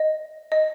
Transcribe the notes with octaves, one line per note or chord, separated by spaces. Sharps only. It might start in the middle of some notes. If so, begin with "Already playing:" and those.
Already playing: D#5
D#5